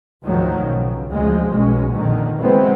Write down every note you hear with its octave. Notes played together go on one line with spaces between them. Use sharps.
D2 G#2 D3 D#3 F3 F#3
B1 C#3
D2 C#3 F3 G#3
B1 B2 G#3 C#4
A#1 F2 D3 D#3
D3 E3 F#3 G#3 B3 C4